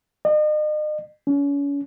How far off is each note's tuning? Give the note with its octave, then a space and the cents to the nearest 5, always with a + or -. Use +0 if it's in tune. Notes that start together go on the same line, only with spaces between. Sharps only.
D#5 -40
C#4 +35